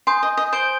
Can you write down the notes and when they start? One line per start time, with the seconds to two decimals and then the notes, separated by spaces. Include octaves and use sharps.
0.07 G#5 C6 D#6 G6
0.23 D#5
0.37 D#5
0.53 C5 G6 D7 G7